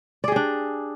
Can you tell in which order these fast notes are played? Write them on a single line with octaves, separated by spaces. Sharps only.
D5 G#4 G4 D4